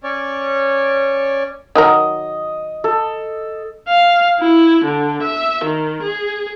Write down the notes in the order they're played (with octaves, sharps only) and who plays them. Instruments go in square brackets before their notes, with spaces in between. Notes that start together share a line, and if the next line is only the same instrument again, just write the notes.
[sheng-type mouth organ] C#4 C#5 D5
[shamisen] D#3 F#3 A#4 [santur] D#5
[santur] A4
[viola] F5
E4
D3
E5
D#3
G#4